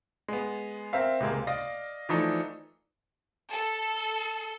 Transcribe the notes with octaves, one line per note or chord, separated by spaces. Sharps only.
G#3 B3
C4 A#4 E5 F5
C#2 C3 G#3 A#3
D5 D#5 F5 A#6
E3 F3 A3 D4 D#4 A4
A4